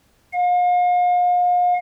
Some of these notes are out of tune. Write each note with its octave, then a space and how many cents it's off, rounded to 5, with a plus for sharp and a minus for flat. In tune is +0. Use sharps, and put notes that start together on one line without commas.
F5 +40